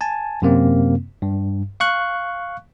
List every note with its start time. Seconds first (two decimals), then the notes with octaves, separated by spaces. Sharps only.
0.01 G#5 A5
0.42 F#2 C3 A#3 C4
1.22 G2
1.80 F5 C#6 F#6